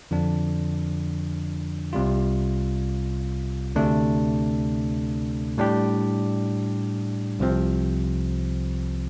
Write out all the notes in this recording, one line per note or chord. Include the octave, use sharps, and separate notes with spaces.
F2 D3 F3 D4
C2 C3 G3 F4
D2 C3 A3 D4
A2 G3 D4 G4
C2 C3 F3 C4